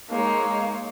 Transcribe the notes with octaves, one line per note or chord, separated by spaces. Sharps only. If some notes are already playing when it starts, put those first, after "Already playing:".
G#3 A#3 D#4 C#5